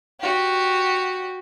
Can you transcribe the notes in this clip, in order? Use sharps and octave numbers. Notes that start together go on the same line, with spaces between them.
F#4 G4